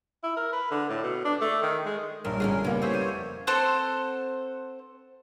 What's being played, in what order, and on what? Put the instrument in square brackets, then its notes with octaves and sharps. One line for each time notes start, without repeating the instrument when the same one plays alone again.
[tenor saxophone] E4
A#4
B4
D3
A2
B2
D4
A3
D#3
G#3
[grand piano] A#1 C#5 [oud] G2 [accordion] A#4
[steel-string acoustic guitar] D3 E3 G#3 [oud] C#4 D4 G#4
[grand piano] F#1 F#5 [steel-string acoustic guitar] G3 A#3 B3 [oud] C#4
[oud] A3 G#4 [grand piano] E4 [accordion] C5 C#5
[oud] F2 [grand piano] C#6 D#7
[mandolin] C4 A4 C5 F#5